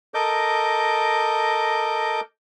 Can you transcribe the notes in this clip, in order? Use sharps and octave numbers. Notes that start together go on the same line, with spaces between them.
A4 A#4 D#5 D6 G6